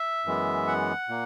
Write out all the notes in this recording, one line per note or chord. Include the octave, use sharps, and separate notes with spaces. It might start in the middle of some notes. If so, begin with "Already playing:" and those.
Already playing: E5
F#2 E3 G#3 B3
F#5
A#2 A#3